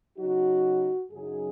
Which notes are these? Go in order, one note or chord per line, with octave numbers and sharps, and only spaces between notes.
C#3 F#3 D#4 F#4
F#2 C#3 F#3 D#4 G#4